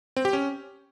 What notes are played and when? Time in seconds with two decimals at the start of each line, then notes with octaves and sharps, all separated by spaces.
0.17 C4
0.25 G4
0.33 C#4